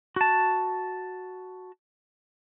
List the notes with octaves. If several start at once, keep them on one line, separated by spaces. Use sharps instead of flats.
F#4 A5